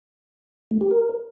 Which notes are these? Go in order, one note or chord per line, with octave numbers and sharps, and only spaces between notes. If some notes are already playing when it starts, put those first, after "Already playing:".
A3
G4
A#4